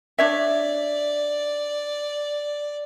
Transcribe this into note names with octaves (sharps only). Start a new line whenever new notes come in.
D4 C#5 D5 E5